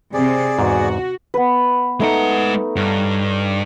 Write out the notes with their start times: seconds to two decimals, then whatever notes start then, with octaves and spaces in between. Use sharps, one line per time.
0.14 C3 C4 G#4 D5
0.59 E2 G#2 F#4
1.34 B3 B4
2.00 G#3 A3 D#4 F#5
2.76 G2 C#5 G5 A#5